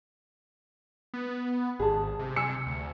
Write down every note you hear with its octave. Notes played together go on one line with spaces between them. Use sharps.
B3
G#1 G#4 A5
C3
G#5 E6 C#7
D2